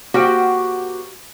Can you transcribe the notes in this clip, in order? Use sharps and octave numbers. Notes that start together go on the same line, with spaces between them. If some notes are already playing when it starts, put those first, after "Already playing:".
A#3 F#4 G4 C5 F#5 G5